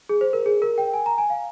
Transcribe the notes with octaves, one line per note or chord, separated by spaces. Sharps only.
G#4
C5
A#4
G#4
A#4
G5
G#5
A#5
G#5
F5